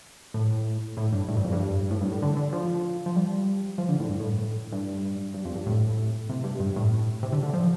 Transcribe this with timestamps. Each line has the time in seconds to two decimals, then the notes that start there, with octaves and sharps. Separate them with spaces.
0.34 A2
0.97 A2
1.13 G2
1.28 A2
1.36 G2
1.44 F2
1.52 G2
1.91 A2
2.01 G2
2.12 A2
2.22 D3
2.37 D3
2.53 F3
3.06 F3
3.16 G3
3.78 F3
3.89 D3
4.00 A2
4.09 G2
4.20 A2
4.72 G2
5.34 G2
5.45 F2
5.55 G2
5.66 A2
6.29 C3
6.44 G2
6.60 G2
6.76 A2
7.23 C3
7.32 D3
7.43 D3
7.54 F3